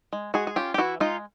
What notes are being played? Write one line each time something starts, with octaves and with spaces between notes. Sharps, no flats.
G#3
G#3 F#4 G#4
G#4
C#4 F4 G4
G4
E3 E4 F#4
G#3 D#4 F4